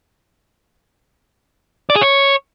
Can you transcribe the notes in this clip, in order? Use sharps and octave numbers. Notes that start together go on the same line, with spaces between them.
D5
G#4
C#5